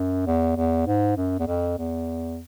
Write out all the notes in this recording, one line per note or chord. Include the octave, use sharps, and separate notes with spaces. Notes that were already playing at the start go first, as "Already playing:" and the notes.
Already playing: F#2
E2
E2
G#2
F#2
E2
F2
E2